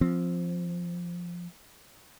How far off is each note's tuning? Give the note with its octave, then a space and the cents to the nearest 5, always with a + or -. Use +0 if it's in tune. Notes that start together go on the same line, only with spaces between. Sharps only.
F3 +0 C4 +0